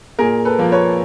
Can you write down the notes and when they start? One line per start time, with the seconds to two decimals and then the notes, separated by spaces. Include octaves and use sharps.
0.19 A#2 G#4 A#4
0.45 A4 B4
0.59 F3 A#3
0.72 B4 C#5